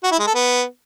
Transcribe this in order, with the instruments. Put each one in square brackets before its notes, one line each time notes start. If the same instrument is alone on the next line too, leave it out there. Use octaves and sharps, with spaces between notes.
[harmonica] F#4
E4
G#3
A4
B3